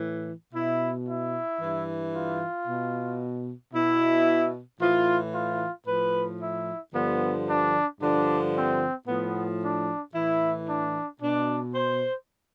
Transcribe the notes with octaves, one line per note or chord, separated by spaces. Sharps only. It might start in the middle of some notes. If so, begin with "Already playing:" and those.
Already playing: A2 E3
B2 E4
E4
G2 E3
F4
B2
B2 E4
A2 E3 F4
F4
A2 F3 B4
E4
G2 D3 F3 B3
D4
G2 D3 F3 D4
C4
A2 F3 B3
D4
A2 E3 E4
D4
B2 D4
C5